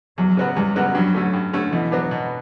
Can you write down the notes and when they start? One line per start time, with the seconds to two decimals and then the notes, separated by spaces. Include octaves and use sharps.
0.18 E2 F#3
0.37 C#3 F#3 B3 F#4
0.56 E2 G3
0.76 C#3 F#3 B3 F#4
0.95 G2 F#3
1.14 D3 A3 C#4
1.33 G2
1.53 D3 A3 C#4
1.72 B2 E3
1.91 F#3 B3 D4
2.11 B2